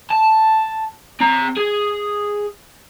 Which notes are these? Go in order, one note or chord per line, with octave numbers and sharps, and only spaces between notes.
A5
C4 A#5
G#4